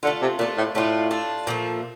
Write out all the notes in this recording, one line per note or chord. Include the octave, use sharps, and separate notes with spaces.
D3 A3 D4 F4
C3
A#2 A3 D4 F4
A2
A2 A3 D4 F4
A3 D4 F4
A#2 F3 A3